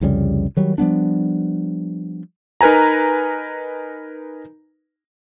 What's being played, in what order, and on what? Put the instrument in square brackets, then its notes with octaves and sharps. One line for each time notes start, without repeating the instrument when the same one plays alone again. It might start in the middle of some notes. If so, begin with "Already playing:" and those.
[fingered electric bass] C2 F2 C#3 G3
D#3 F#3 G3
F3 G3 B3 D4
[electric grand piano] D#4 A#4 B4 G#5 A#5